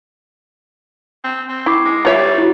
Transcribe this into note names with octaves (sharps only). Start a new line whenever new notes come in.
C4
C4
E4 C#6 D6 C7
G#3
G3 F4 C#5 E5
E4 F#4